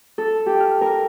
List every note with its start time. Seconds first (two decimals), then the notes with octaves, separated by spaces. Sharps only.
0.18 A4
0.46 G4
0.60 F6
0.81 A#4